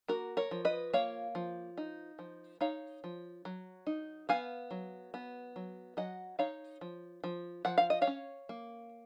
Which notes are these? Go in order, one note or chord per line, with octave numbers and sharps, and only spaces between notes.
A#3 F#4 A#4
A#4 C#5
F3
B4 D#5
A#3 C#5 F5
F3
D#4
F3
D#4 C#5 F5
F3
F#3
D#4
B3 F5 G#5
F#3
B3
F#3
F#3 D#5 F#5
D#4 C#5 F5
F3
F3
F3 F#5
F5
D#5
C#5 F5
C#4
A#3